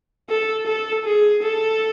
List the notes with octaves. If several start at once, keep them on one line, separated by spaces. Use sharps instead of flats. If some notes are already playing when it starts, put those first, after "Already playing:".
A4
A4
G#4
A4